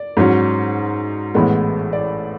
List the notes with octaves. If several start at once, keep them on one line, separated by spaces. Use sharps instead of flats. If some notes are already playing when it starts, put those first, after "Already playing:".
Already playing: D5
G#2 F#3 C#4
A1 A2 G#3 B3
D5